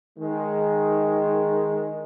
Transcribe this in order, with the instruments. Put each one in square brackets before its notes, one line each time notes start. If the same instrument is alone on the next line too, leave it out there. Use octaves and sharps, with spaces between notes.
[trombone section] D#3 G#3